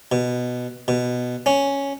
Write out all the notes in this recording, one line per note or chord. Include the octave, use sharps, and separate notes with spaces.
B2
B2
C#4